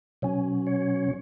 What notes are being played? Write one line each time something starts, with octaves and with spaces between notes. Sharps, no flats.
B2 F#3 C#4
C#5